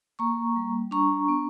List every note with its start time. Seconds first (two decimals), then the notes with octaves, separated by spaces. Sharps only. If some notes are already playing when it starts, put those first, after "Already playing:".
0.19 A#3 A#5 C#6
0.56 G3
0.91 D4 A#5 C#6
1.28 B3